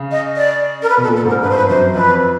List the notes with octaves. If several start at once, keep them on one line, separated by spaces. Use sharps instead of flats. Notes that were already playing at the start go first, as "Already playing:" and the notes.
Already playing: C#3
D#5
D5
A#4
B4
B2
A4
A#2
A4
G#2 A#4
G2 B4
C5
B4
F#2 C5
F2 B4